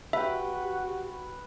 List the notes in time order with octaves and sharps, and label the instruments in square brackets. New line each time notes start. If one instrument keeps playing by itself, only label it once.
[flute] F#4 [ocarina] G4 [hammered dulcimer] B4 G5 [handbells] E5